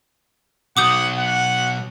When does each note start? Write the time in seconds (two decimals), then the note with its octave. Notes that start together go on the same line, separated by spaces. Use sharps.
0.77 B2 F#3 F#5 D6 D#6 G6
1.18 F#5